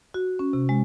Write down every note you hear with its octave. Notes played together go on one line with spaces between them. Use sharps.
F#4
C#4
C3
G#3